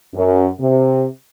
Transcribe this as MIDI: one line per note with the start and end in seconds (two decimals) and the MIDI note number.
0.15 0.48 42
0.60 1.05 48